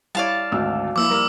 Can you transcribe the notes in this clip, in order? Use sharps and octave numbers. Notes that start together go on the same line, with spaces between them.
G3 E4 C#5 D5 F5 A5
G#1 D2 E6
F3 A#3 E4 D6 E6
G3 A#4 F6